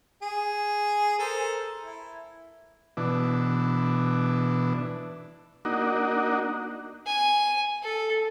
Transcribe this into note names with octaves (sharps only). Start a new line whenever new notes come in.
G#4
A4 A#4 C5
E4
B2 E3 D4
A#3 D4 D#4 F#4
G#5
A4